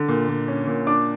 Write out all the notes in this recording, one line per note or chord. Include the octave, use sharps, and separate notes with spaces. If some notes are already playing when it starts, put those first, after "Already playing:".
Already playing: D3
A#2
A#2
C#4
A#2
D4 D6